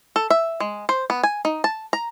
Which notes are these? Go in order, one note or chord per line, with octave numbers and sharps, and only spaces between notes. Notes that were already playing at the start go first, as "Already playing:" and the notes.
A4
E5
G#3
C5
B3
G#5
D#4
A5
A#5